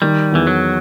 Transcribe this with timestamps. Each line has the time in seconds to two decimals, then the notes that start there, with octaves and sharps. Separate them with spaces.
0.02 D#3 G3
0.32 E2 E3
0.47 F#3